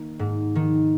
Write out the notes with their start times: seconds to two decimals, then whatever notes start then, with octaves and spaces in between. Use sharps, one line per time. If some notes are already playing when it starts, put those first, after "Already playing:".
Already playing: D#3 A#3
0.19 G#2
0.55 D#3